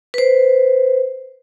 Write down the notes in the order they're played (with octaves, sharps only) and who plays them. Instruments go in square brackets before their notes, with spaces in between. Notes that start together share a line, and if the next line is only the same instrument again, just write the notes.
[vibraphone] B4 C5